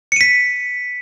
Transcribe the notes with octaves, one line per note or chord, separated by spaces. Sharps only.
B6 C#7 D#7